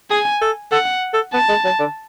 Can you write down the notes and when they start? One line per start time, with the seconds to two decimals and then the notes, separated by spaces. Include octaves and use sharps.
0.10 G#4 G#5
0.41 A4
0.72 A4 F#5
1.14 A4
1.33 B3 A5
1.49 G#3
1.64 F#3
1.79 D3